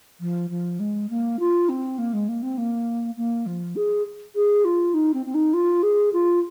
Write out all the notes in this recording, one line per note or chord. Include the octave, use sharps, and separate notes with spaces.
F3
F3
G#3
A#3
F4
C4
A#3
G#3
A#3
C4
A#3
A#3
F3
G#4
G#4
F4
D#4
C4
C4
D#4
F4
G#4
F4